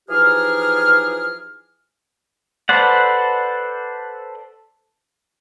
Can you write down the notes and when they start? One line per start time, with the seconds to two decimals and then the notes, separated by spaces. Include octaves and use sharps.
0.09 E3 F3 D#4 G4 G#4 F6
2.69 A4 B4 C5 D5 F#5